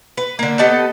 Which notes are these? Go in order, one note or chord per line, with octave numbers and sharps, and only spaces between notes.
B4
D3 A#3
B3 G4 A4 D#5